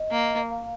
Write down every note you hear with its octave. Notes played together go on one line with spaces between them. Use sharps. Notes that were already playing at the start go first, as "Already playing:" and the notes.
Already playing: D#5
A#3
F5